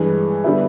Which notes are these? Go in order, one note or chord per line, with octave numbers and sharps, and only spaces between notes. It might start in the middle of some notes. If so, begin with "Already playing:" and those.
Already playing: G2 E3 G#3
D3 G3 B3 E4